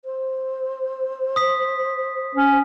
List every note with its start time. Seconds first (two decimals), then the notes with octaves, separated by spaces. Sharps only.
0.05 C5
1.36 D#6 B6
2.35 C#4